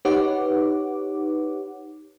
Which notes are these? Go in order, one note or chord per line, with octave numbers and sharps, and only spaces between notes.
D#4 G4 B4 C#5 F#5 D6